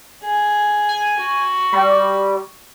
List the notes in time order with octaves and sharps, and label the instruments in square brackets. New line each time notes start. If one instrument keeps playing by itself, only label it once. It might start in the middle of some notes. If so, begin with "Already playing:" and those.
[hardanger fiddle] G#4
[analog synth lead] G#5
[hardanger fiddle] F#4
[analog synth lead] G3